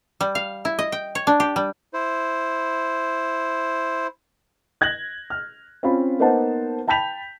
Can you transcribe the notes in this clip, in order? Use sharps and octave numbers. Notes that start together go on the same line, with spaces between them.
G3
F5
E4
D#5
G5
C#5
D4
G4
G3
E4 C5
F#6 G#6 A#6 F#7
F6
C4 C#4 F4 F5 B5
A#3 B3 D#4 C5 F#5 A5
G5 A5 B5 G6 B6 F7